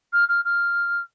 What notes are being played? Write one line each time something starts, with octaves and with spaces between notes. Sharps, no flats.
F6
F6
F6